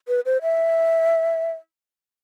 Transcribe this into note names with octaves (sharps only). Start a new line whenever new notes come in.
B4
C5
E5